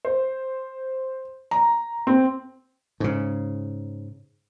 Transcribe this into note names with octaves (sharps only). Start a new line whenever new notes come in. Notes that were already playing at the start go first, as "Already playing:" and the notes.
C5
A#5
C4
G#2 C#3